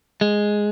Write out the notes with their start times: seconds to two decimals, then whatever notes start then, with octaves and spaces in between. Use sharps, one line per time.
0.21 G#3